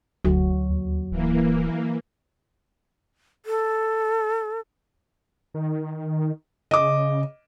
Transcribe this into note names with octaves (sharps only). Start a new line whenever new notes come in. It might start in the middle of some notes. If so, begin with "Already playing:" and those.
F1 D2 F#3 F#4
D#2
D1 E3 A#3
A4
D#3
C#3 D#5 D6